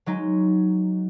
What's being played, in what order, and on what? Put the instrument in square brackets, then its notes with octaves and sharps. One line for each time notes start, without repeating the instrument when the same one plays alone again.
[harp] F#3 G#3 D#4